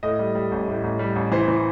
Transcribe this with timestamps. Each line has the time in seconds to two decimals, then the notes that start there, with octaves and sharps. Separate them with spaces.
0.03 A2 D#5
0.19 G3
0.35 G3
0.51 A1
0.68 A2
0.84 A1
0.99 G3
1.16 A1
1.32 E3 C5
1.48 E3